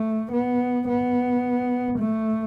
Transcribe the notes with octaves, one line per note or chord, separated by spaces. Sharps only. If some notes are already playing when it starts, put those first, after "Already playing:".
Already playing: A3
B3
B3
A3